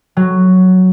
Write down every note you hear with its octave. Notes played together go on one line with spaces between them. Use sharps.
F#3